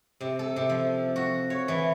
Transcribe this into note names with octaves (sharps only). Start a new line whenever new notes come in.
C3
A4
C3
F3
F#4
C#5
E3